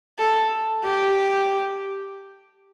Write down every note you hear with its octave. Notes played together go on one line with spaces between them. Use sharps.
A4
G4